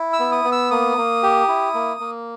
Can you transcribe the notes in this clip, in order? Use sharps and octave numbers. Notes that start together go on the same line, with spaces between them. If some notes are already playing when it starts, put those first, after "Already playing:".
Already playing: E4
E6
B3
D#6
B3
E6
A#3 D#6
A#3
G4
E4
A#3
A#3